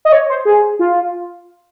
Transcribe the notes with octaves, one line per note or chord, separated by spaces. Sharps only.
D#5
C#5
C5
G#4
F4